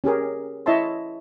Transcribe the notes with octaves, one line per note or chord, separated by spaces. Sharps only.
C#4 G4 G#4 A#4
E4 C#5 D#5 E5 A5 C6